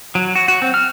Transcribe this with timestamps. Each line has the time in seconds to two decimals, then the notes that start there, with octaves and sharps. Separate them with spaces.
0.15 F#3
0.35 F#4
0.48 F#4
0.62 C4
0.74 F6